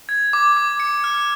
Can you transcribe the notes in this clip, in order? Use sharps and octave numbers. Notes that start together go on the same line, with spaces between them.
G#6
D6
D6
C#7
F6